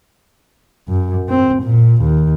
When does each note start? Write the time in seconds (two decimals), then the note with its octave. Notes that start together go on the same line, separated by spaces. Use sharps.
0.88 F#2
1.28 C4
1.63 A#2
2.02 D#2